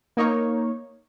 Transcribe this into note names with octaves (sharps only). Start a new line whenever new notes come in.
A#3 D#4 C#5